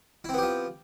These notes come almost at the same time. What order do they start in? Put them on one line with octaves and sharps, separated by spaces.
E4 C4 B3 G4 F3